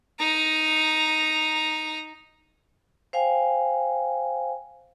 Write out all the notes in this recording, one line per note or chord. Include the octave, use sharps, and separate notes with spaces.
D#4 A#5
C5 F5 G5 G#5